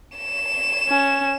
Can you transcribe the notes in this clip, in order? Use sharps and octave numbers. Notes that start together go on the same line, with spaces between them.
E7
C#4